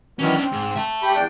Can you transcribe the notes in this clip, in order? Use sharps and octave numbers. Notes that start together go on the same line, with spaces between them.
D#3 E3 F#3 C#4 D4
C4
G#2
E5 A5
G4 B5
E2 D4 G5